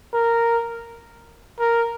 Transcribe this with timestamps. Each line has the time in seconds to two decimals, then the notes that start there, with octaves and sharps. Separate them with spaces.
0.14 A#4
1.60 A#4